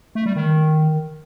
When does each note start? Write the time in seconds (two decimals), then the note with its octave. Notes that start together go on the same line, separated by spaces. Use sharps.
0.15 A3
0.26 G3
0.36 D#3